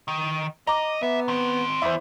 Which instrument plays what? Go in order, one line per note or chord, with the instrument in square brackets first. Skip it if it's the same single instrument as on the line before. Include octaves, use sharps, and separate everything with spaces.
[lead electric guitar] D#3
[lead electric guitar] D#5 [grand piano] A#5 D6
[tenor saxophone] B3 [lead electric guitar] E5
[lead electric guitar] D#3 C4
[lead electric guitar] E2 [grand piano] E4 C5